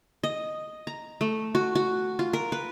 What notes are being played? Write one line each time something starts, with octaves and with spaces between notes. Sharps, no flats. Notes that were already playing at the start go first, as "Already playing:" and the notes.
D#5
A#5
A3
F#4
F#4
F4
A#4
B4